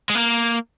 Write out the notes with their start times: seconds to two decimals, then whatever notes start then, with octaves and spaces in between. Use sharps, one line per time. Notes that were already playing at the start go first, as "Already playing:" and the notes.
0.10 G#3
0.15 A#3